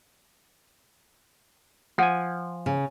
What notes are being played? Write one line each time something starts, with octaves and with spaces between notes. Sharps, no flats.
F3 F#5 G#5
C#3